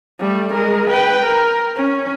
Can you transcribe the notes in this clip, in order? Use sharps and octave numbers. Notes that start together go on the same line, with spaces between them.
G3 A3
G#3 A#4
B4 G5
A#4
C#4